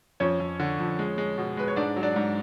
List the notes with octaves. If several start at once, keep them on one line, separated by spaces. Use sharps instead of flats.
F2 C#4 C#5
F2
D3
F2
G#3
G#3
B2
G#3 B4
C#5
G#2 D4 D5
F#3
D4 D5
G#2